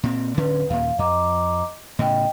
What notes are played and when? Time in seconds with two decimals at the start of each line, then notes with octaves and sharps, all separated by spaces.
0.03 A#2 C4
0.37 D1 D3 C#4 B4
0.70 D#2 A#2 F5
0.99 F2 D#5 A#5 D6
1.99 A2 C#3 D#5 G5